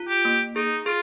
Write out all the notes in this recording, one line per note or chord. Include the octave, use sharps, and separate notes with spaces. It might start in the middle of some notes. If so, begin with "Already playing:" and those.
Already playing: F4
G4
A#3
D#4 G#4
F4 G#4